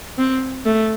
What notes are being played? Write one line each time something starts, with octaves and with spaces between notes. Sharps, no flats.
C4
A3